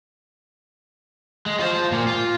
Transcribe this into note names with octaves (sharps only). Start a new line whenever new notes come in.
G#3
F4 C5
A#2 A#3
F4